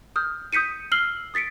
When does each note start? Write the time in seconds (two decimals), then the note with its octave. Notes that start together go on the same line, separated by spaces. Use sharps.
0.16 D#6 F6 G6
0.53 D#6 G6 B6 C#7 D#7
0.92 E6 F6 C7 F#7 G7
1.34 D#6 A6 B6 C#7 D7